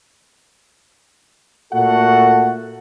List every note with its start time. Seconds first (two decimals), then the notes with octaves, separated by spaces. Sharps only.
1.72 A#2 A3 F#4 A4 F#5